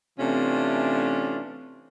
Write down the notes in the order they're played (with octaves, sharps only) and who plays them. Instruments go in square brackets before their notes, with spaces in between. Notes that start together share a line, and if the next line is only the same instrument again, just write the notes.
[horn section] C3 E3 A3 C#4 D4 F4